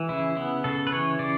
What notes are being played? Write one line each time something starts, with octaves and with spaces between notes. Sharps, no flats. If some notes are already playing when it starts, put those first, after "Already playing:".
Already playing: E3
C#3 E4
B3 E4
C#3 A4
B4
E3 C#5
C#3 D5